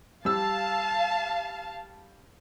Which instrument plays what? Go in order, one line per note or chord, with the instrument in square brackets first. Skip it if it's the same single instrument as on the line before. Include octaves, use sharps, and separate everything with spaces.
[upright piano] G3 E6 [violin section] F5 A5